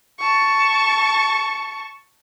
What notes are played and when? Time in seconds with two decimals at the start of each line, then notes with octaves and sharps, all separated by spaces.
0.19 A5 C#6